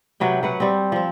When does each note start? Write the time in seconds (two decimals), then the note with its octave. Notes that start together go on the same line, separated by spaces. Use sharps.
0.20 C3 F#3 B4 G5
0.43 F#3 B4 F#5
0.60 G3 C4
0.92 F3 C4